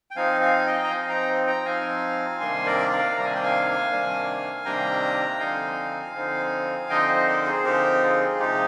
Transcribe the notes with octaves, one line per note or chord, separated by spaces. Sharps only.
G5
F3 C4 D#4 F5 G#5
F5 G#5
G#5
D#5 G5
A#5
F3 C4 D#4 F5 G#5
G5 A#5
G5 A#5
F3 C4 D#4 F5 G#5
C3 D#3 G3 A#3 D4 G#5 C6
A#4 D5
D5 F5
C3 D#3 G3 A#3 D4 A#5
G#5
G5
F5 G#5
C3 D#3 G3 A#3 D4
C3 D#3 G3 A#3 D4 G5 A#5
D3 F3 C4 D#4 F5 G#5
D3 F3 C4 D#4
D3 F3 C4 D#4 D#5 G5
C5 D#5
A#4 D5
G#4 C5
D3 F3 C4 D#4 G4 A#4
F4 G#4
C3 F3 G#3 D#4 G4